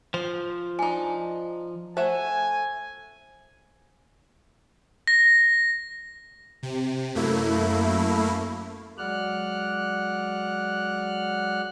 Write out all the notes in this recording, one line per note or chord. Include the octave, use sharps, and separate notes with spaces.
F3 C5
D4 D#4 G#5 D6
A3 C5 E5 F#5 G#5
A#6
C3
F#2 A3 A#3 E4
F#3 G#3 D5 F#5 F6 F#6